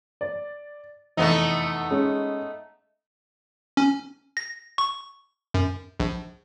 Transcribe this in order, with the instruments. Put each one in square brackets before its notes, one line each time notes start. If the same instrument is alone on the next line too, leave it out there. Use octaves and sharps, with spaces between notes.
[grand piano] D5
[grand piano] F1 E2 [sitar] A3 B3 D#4
[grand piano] G#3 C#4
[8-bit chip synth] C#4
A#6
C#6
F#2
A#1